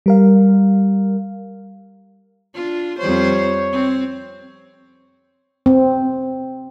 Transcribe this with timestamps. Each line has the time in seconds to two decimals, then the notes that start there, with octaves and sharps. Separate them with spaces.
0.06 G3 A#4 F5
2.54 D4 F4
2.99 F2 G3 C5 C#5
3.72 C4
5.66 C4